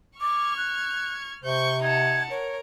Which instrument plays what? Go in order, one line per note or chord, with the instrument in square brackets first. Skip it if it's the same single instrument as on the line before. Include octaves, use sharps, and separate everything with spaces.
[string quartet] C#6 F6 G#6 [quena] D6
[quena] F#6
[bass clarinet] C3 [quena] C5 [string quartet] C#6 G6
[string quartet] D#4 F#5 A5 [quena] G#6
[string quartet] A#4 [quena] C#5